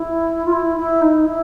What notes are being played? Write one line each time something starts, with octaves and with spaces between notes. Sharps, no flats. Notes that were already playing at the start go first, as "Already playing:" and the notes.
Already playing: E4
F4
E4
E4
D#4
E4